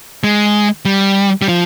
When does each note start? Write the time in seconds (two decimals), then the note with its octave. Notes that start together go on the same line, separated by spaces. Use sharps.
0.24 G#3
0.85 G3
1.42 G3
1.49 F3